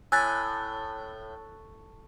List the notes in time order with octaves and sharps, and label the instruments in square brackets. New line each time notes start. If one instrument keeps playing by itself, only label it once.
[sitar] A2 [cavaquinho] G#5 B5 [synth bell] E6 F#6 A6